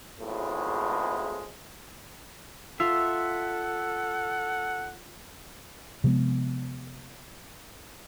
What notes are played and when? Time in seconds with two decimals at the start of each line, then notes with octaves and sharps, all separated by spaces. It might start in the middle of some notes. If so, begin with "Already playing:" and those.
0.20 G#1 E2 A2 C#3 F3 G#3
2.80 F4 A4 E5 F#5 F6
6.04 C3 F3 G#3 B3